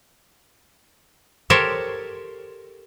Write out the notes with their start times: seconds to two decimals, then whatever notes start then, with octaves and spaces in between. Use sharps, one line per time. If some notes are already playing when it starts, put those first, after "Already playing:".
1.50 G4 A4 A#4 C5 C#5